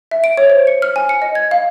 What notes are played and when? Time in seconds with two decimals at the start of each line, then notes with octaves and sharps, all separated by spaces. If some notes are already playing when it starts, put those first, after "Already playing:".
0.11 E5
0.24 D7
0.37 C#5
0.50 C5
0.67 C#7
0.82 F6
0.96 G#5
1.09 C#7
1.22 D#5
1.35 G#6
1.51 F5